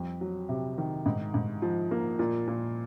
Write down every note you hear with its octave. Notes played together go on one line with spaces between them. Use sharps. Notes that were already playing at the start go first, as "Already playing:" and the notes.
Already playing: F2 G3
F#3
C3
D#3
G#2
G#2
F3
A#3
A#2
A#2